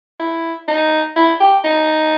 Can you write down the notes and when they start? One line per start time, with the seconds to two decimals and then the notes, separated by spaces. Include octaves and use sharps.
0.19 E4
0.68 D#4
1.16 E4
1.40 G4
1.64 D#4